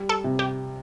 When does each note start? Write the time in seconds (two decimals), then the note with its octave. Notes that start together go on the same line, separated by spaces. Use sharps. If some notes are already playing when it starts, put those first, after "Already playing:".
Already playing: G3
0.09 A4
0.24 C3
0.39 G4